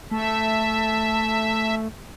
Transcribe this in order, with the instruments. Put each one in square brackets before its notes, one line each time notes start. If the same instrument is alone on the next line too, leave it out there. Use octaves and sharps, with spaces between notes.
[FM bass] A3 [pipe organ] E5 [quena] A5